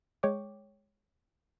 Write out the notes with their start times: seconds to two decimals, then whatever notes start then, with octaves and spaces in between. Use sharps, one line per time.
0.23 G#3 C#5 G5 D6